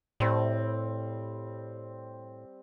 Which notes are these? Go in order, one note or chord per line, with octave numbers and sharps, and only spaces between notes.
A2 G3 C4